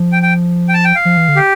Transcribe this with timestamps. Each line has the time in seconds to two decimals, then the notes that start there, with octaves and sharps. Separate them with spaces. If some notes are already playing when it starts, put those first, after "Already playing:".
Already playing: F3
0.12 G5
0.22 G5
0.69 G5
0.74 A5
0.85 G5
0.95 F5
1.05 F3
1.17 E3
1.29 D3
1.36 G4